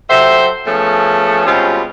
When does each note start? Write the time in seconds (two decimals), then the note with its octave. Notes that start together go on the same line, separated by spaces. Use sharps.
0.10 F#3 G4 A4 C5 E5
0.66 F3 A3 B3 C#4 G#4 A4
1.46 B2 G3 G#3 C4 C#4 F4